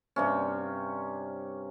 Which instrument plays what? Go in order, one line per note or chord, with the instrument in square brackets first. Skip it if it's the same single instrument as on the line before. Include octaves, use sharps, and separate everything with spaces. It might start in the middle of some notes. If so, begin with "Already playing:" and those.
[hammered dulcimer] G2 C3 C#4